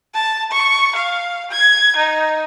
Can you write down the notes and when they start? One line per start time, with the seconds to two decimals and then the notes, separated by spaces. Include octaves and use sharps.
0.14 A5
0.51 C#6
0.95 F5
1.51 G#6
1.96 D#4